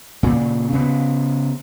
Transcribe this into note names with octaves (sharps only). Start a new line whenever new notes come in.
A#2 C#3
C#3 B3